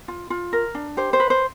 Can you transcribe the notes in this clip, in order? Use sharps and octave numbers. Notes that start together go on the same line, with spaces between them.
F4
F4
A#4
D4
G4 C5
C5
B4
C5